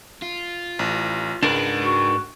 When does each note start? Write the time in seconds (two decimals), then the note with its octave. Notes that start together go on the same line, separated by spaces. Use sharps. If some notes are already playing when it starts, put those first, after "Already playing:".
0.22 F4
0.79 A1
1.43 C#2 G#2 G#3 D4 A#4 B4
1.84 F#4